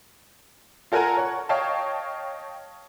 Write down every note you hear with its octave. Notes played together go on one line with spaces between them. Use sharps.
F4 A4 A#4 F#5 G#5 A#5
C#5 F#5
C#5 D#5 F5 G5 A5